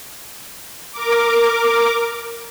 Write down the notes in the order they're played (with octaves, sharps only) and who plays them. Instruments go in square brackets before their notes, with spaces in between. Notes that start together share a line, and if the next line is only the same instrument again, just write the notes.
[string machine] A#4 D6